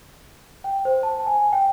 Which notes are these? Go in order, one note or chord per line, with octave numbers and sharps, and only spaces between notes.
G5
C5
A5
G#5
G5